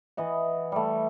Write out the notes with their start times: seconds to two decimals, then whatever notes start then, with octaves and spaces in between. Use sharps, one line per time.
0.17 E3 D#5 F#5
0.72 G3 A3